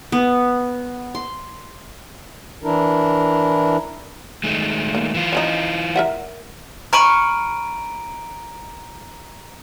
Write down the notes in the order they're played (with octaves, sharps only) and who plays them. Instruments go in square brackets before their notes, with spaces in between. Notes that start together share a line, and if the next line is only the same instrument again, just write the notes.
[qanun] B3
C6
[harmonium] E3 D4 E4 A#4
[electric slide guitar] D#3 G#3 A3
[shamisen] A#3
[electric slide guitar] E3 F4
[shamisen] F3 C#4 D#4
A#4 E5 F#5
[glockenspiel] A#5 D7 D#7 [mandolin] B5 C#6 F6